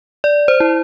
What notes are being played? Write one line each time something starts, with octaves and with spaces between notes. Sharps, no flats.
D5
C5
E4